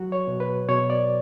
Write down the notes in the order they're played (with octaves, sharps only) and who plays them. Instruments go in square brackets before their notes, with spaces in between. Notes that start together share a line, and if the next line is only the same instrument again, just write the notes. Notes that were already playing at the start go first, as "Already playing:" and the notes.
Already playing: [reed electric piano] F#3 F#4
C#5
B2
B4
B2 C#5
D5